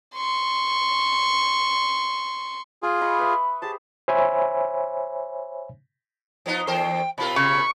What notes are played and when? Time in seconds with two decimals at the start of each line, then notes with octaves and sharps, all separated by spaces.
0.16 C6 C#6
2.83 F4 G#4 D6
3.01 D#5 B5 C#6
3.19 B4 E5
3.62 G4 G#4 C5 A5
4.08 C5 C#5 E5 G#5 B5
6.46 F3 B3 D#4
6.67 E2 A#4 C5 G5
7.18 B2 F4 A#4 B5
7.36 C#3 C#6